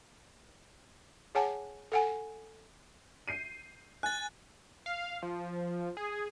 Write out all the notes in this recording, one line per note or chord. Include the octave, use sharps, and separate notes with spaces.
G#4 C#5 F#5 G#5 A5
A4 F#5 G#5
G6 C7 D#7
G#5 F#6 A6
F5
F3
G#4